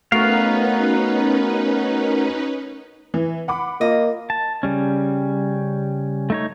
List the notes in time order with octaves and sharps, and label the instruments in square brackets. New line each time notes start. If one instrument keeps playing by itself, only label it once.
[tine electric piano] A3 [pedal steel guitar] B3 F5 [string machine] C#4 D#4 B4 [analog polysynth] F#4 A#4
[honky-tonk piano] E3
F#5 B5 D6
[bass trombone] A#3 [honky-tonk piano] F4 [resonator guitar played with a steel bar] D#5
[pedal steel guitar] A5
C#3 G3 C#4
A3 D#4 C#5